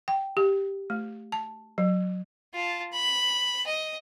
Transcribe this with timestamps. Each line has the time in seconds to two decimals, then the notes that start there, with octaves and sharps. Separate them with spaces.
0.08 G5
0.37 G4
0.90 A3
1.32 A5
1.78 F#3
2.54 F4 A5
2.92 B5
3.67 D#5